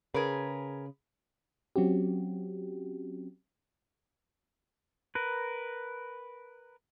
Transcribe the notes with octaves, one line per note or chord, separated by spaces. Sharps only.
C#3 G#4 A#4 B4
F#3 C4 C#4 F#4 G4
A#4 B4